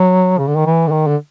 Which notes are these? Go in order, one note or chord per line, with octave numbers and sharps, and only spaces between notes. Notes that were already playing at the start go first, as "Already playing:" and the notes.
Already playing: F#3
C#3
D3
D#3
E3
D3
D#3
D3